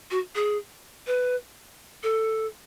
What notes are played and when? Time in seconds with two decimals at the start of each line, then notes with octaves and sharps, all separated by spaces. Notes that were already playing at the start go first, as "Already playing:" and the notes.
0.11 F#4
0.35 G#4
1.07 B4
2.03 A4